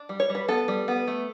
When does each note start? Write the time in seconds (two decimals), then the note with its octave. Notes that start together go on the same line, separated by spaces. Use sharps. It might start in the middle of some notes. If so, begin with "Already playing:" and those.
Already playing: D4
0.09 G3
0.20 C#5
0.29 G3
0.35 B4
0.48 B3 A4
0.68 G3
0.88 B3
1.07 A3